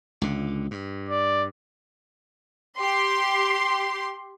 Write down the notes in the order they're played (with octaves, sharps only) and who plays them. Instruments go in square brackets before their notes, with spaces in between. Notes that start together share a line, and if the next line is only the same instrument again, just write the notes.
[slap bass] C#2 D3
G2
[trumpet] D5
[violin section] G4 C6